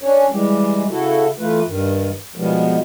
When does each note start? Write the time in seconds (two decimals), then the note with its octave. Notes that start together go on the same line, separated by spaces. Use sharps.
0.02 C#4 D4 C#5
0.30 E3 G3 G#3 G4
0.90 C#3 E4 F#4 A4
1.39 E3 A3 F4 B4
1.66 G2 D#3
2.36 B2 D#3 F3 G3 G#3 B3